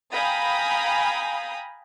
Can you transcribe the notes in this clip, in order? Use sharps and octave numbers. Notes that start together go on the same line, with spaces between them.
F5 G5 G#5 A#5 B5 D#6